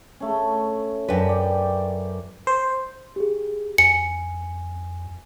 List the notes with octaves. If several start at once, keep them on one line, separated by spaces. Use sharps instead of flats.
A3 C#4
F#2 B4 D5 G5 A5
D5 G5
C5
G4 G#4
F2 G#5 C#7